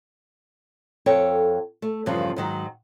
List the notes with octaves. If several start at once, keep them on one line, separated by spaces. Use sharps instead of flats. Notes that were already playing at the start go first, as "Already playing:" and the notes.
F2 A4 C#5 G5
A3
E2 G2 C#3 F3
G#2 D#3 F#3